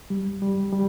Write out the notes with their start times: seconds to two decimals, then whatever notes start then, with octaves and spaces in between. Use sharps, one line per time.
0.10 G3
0.42 G3
0.73 G3